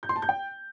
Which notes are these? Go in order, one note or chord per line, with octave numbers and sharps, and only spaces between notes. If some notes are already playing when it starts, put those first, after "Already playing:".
G6
C6
A5
G6
G5